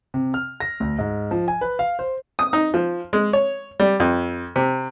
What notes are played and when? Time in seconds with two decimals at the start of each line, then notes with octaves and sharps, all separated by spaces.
0.14 C3
0.34 F6
0.60 A#6
0.80 D2
0.99 G#2
1.31 F3
1.48 G#5
1.61 B4
1.79 F5
1.99 C5
2.39 D#6
2.53 D#4
2.74 F3
3.13 G#3
3.33 C#5
3.80 G3
4.00 F2
4.56 C3